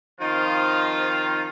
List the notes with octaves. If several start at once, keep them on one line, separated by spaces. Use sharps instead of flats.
D#3 F3 C4 D#4 F4